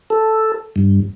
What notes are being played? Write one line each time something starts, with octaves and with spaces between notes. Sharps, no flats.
A4
G2